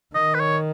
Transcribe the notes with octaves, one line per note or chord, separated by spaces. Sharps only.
D#3 D#5
B4
C#5